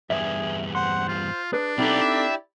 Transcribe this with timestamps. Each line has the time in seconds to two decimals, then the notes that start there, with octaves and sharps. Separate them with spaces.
0.10 E2 G2 G#4 E5
0.75 C5 F#5 C6
1.08 F4
1.53 D4 G#4 B4
1.78 B1 B3 C4 D#4 E4 G4 A4 D5
2.01 E5